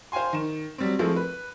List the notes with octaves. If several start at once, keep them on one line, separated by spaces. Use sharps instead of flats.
C5 F5 G5 G#5 C6
D#3 E7
F#3 G3 C4
F3 G#3 A3 C4 E4
B4